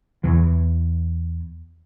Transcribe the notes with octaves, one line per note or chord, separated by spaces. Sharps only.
E2 E3